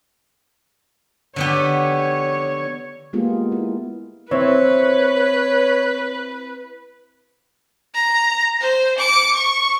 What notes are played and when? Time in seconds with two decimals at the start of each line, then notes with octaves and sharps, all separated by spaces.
1.36 D3 B3 G4 C#5
3.13 G#3 A#3 B3 F4 G4 G#4
3.52 E4
4.31 C4 E4 B4 C#5
7.94 A#5
8.61 C5
8.98 D6 C#7
9.35 C#6